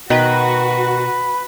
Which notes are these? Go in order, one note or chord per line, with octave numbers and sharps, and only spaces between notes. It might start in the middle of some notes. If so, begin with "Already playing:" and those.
B2 D#3 F#4 B4